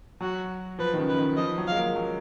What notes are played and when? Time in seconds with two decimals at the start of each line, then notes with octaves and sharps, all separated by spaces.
0.21 F#3 F#4
0.79 F3 B4
0.94 D#3
0.98 C#3
1.09 B4
1.14 C#3
1.18 D#3
1.37 F3 D#5
1.48 F3
1.58 F#3
1.67 F5
1.72 G#3
1.76 A#3
1.96 F#3